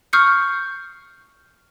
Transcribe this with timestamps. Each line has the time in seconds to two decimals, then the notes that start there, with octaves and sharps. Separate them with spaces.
0.13 C#6 D#6 F6 G6 C7 C#7